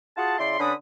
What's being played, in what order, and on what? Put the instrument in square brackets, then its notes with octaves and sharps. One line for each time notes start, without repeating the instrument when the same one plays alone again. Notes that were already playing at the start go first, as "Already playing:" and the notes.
[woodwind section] F4 F#4 G#4 F#5 A5
C#3 E4 D5 C6
D3 C#4 D4 B4 B5 D#6